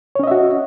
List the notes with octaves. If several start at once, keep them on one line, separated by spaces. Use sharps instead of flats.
C#4 F#4 C#5 D#5 E5